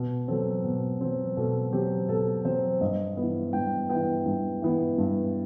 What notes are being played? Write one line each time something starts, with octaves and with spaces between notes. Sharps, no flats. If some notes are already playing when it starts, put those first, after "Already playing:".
Already playing: B2
F#3 C4 A4
B2
F#3 C4
B2 A4
F#3 C4 G4
B2 A4
F#3 C4 C5
G2 D#5
E3 B3
G2 G5
E3 B3 G5
G2
E3 B3
G2